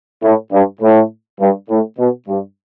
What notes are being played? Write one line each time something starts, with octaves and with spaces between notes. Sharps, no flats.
A2
G2
A2
G2
A2
B2
G2